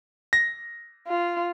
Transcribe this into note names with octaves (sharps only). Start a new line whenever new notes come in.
A#6
F4